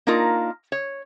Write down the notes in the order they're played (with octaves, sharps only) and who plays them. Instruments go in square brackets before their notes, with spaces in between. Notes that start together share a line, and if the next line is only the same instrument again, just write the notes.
[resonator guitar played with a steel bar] A#3 D4 D#4 F4 A#4
C#5